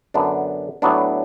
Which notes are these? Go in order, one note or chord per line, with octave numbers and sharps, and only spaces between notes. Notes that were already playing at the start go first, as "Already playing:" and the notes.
F#2 D3 B3 D4
A2 F#3 B3 D4